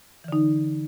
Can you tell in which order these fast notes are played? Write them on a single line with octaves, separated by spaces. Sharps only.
E3 D3 D#4